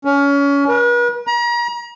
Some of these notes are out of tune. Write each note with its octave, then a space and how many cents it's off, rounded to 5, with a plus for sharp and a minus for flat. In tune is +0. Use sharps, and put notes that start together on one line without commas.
C#4 +25
B4 -45
A#5 +40